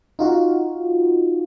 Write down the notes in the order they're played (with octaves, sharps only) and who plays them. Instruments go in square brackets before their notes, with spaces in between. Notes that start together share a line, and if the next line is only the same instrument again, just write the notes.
[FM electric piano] D#4 F4 F#4